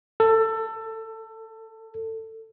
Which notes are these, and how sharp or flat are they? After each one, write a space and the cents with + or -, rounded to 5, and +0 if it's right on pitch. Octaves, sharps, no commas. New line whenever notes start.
A4 +20